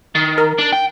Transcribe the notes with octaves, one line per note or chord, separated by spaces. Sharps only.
D#3
A#4
D4
G5